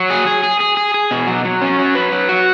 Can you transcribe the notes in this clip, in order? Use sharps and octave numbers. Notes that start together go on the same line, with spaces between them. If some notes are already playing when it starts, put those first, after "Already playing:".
Already playing: F#3
G#4
G#4
G#4
G#4
G#4
G#4
B2
F#3
F#3
C#4
F#3
B4
F#3
F#4